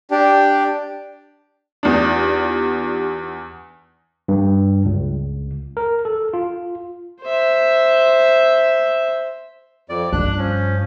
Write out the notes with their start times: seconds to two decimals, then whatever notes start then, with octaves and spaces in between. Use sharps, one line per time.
0.11 D4 G4
1.83 E2 D4 D#4 F4 G4
4.28 G2
4.85 C#2
5.77 A#4
6.05 A4
6.33 F4
7.22 C5 E5
9.90 F2 D5
10.13 G2 D4 F#6
10.38 F3 C#4